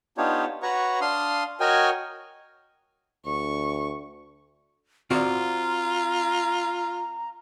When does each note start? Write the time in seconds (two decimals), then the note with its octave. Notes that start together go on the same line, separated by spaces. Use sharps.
0.18 B3 D4 D#4 F4 G4 C#5
0.63 F#4 B4 C#5 F#5 A#5 C#6
1.01 D4 F5 C6 D#6
1.60 F#4 A#4 C#5 D#5 G5 G#5
3.26 D2 C#6
5.11 C4 F4 F#4 D5 A#5